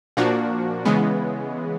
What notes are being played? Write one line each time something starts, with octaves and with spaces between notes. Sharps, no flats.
A#2 F3 A#3 D4 F#4
C#3 E3 G#3 B3